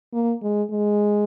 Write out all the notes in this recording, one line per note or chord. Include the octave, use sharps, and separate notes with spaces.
A#3
G#3
G#3